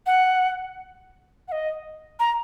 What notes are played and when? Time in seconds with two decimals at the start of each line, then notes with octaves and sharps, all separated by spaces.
0.06 F#5
1.48 F#5
1.52 D#5
2.20 A#5